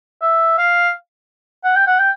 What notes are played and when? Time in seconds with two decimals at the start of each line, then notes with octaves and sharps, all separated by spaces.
0.22 E5
0.58 F5
1.64 F#5
1.76 G5
1.87 F#5
1.99 G5